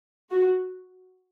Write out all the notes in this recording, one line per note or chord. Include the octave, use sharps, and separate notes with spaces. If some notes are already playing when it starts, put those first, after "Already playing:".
F#4